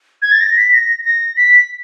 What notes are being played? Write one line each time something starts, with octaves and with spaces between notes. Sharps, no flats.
G#6
A6
A#6
B6
A#6
A#6
B6